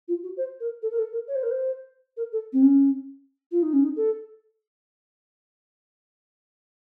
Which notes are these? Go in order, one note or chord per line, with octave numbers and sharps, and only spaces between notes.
F4
F#4
C5
A#4
A4
A#4
A4
A#4
C#5
C5
A#4
C5
A#4
A4
C4
C#4
F4
D#4
C#4
D#4
A4